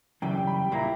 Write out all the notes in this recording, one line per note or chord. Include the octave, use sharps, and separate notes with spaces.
F#2 C#3 E3 G3 G5
B5
A#2 A#3 E4 A#5